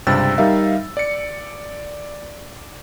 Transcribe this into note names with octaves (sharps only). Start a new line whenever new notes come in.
C#2 G2 C3 C4 E6 A6
G3 D#4 A#4 E5 F5
D5 C#7